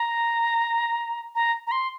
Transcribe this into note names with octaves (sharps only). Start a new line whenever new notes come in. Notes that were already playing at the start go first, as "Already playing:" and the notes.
Already playing: A#5
A#5
A#5
C6